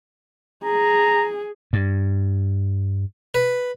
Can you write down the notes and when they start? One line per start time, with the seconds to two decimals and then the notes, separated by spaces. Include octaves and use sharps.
0.64 G#4 A#5
1.73 G2
3.34 B4